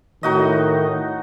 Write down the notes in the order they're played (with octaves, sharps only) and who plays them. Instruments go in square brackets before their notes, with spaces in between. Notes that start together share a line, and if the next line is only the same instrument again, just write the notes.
[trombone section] A2 D#3 [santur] D#4 F#4 D#5